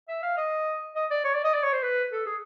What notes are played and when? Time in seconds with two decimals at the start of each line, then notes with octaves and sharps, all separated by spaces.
0.08 E5
0.23 F5
0.37 D#5
0.95 D#5
1.10 D5
1.24 C#5
1.34 D5
1.44 D#5
1.54 D5
1.63 C#5
1.73 C5
1.83 B4
2.12 A4
2.26 G#4